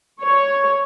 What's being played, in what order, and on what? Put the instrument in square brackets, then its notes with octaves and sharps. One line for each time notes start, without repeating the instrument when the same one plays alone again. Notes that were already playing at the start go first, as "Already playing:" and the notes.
[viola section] C#5